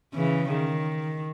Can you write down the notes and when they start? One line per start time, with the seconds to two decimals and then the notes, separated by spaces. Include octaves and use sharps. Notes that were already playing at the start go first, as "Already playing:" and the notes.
0.14 C#3 E3
0.49 D#3